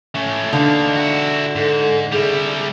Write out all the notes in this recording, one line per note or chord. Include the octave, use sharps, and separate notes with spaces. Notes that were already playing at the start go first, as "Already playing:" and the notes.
A3 C#4
D3 D#4 F5
E4 F#4
G#2 A4
G3 E4 G#4